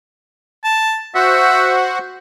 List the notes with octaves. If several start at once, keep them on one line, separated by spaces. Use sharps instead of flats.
A5
F#4 C5 E5 F#5